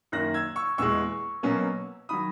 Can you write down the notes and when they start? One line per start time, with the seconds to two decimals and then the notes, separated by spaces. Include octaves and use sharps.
0.12 F#2 D#3 A#3 F#6 A#6
0.34 E6 G#6
0.56 C#6 E6
0.78 E2 B2 G#3 C#6 E6
1.43 B2 F#3 A#3 C#4
2.09 D#3 F#3 B5 D#6